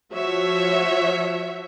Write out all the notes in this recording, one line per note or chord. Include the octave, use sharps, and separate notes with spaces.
F3 F#4 C#5 E5